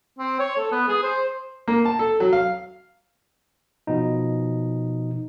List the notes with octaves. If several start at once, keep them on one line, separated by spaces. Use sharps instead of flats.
C4
C#5
A4
B3
G#4
C5
A#3
A5
A4
F#3
F5
B2 F3 D#4